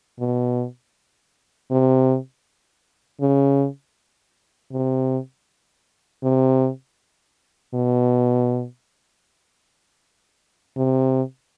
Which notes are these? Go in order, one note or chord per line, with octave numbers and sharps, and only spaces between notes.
B2
C3
C#3
C3
C3
B2
C3